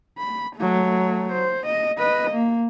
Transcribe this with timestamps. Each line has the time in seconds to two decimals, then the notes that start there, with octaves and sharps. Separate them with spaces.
0.18 B5
0.56 F#3 A3
1.32 C5
1.67 D#5
1.99 B4 D#5
2.31 A#3